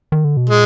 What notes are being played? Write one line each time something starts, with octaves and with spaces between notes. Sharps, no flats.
D#3
D3
B2
A#2 G#3